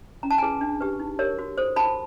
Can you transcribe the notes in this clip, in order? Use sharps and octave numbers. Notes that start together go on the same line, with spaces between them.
C#4 A#5
A5
E4 G#4 B4 G#5 A#5
D4
G4 B4
D#4
G4 A#4 C#5
F#4
A4 C5
F#4 A5 B5